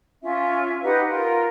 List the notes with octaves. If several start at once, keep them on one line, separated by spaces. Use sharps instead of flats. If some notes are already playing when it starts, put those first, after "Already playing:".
C#4 F4 E5
D#4 G4 B4 F#5
F4 A#4